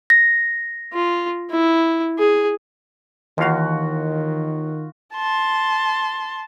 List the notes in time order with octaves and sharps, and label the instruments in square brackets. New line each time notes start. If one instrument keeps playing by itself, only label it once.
[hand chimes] A#6
[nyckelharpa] F4
E4
G#4
[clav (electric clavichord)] D#2 F5 [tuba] D#3 [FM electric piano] E3 [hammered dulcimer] F4 F#4
[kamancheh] A5 C6